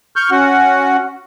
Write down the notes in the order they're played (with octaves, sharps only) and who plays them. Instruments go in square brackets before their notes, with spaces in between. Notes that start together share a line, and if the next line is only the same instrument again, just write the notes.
[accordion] C#6 F6 G6
C#4 F#4 F#5